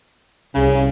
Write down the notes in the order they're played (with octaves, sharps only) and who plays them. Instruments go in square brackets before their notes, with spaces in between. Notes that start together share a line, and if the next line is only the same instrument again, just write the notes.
[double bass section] C2 [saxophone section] C#3